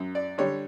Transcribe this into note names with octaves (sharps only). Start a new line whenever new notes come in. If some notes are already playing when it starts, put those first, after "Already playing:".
Already playing: F#2
D5
D3 G3 C#5